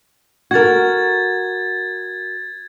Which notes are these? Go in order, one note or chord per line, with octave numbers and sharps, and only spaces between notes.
F#4 A#4 G#6 A6